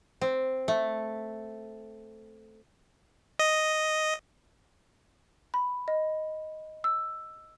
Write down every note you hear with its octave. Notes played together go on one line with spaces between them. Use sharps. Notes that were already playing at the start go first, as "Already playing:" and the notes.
C4
A3
D#5
B5
D#5
E6